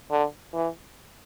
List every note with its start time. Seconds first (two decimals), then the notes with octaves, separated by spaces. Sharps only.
0.11 D3
0.54 E3